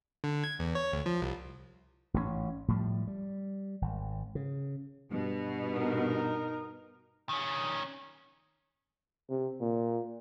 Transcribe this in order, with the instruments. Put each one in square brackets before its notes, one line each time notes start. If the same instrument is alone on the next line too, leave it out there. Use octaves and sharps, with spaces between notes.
[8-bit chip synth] D3
G#6
E2
C#5
D2
F3
C2
[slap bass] A1 G#2 B2 C#4
A2 F3 G3
G3
G#1
C#3
[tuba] G2 [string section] B2
[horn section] D#4 A#4
[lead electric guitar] D#3 C#4
[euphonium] C3
A#2